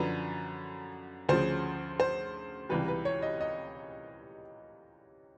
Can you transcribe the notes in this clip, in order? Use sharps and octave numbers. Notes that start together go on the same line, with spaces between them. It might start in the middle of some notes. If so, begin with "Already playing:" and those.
Already playing: F#2 D3 F3 B4
D2 C#3 F3 C5
C5
C#2 C3 E3 G3 B4
B4
C#5
D#5
D#5